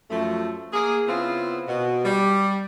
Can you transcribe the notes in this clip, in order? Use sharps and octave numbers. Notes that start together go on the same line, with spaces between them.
F#2 F3 A3
A#3 G#4
C#3 B3 C4 E4 F4
B2
G3